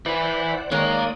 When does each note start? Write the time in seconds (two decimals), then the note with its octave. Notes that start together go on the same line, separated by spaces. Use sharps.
0.06 E4 B4 C5 D5 F#5
0.71 D#3 G#3 A#3 A#4 C#5 D5 D#6